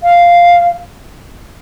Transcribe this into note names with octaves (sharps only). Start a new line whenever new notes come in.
F5